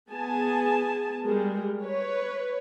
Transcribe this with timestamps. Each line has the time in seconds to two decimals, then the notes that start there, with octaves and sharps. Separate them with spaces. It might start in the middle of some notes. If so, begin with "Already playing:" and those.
0.10 B3 G#4 G#5 A5
1.22 G3 G#3 A#4
1.83 B4 C#5